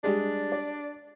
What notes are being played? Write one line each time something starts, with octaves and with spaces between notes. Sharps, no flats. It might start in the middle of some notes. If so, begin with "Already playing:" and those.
G3 G#3 D4 G4
D5